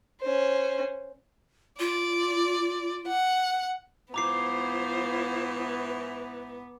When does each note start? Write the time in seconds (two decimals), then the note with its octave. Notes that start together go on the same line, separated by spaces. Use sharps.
0.22 C#4 C5
1.80 F4 D5
3.08 F#5
4.14 G#2 E3 B3 F4 C5 A#5 D6 C7